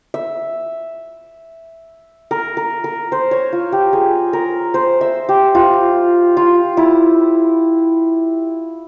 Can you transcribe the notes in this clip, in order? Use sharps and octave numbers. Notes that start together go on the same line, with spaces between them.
E5
A#4
A#4
A#4
C5
C#5
F4
G4
G#4
A#4
C5
E5
G4
F4
F4
E4